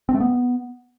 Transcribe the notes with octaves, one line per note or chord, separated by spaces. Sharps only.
C4
A3
B3